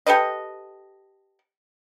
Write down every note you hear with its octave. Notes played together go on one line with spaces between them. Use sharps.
G4 A4 B4 D#5